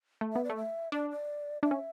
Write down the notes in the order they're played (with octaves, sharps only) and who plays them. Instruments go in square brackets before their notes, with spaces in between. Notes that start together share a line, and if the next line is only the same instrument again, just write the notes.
[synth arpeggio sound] A3
[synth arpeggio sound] B3 [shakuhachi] E5
[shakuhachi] D5
[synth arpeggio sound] A3
[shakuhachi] E5
[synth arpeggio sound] D4 [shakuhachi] D5
[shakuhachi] D5
[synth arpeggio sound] D4 [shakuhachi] E5
[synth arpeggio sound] C#4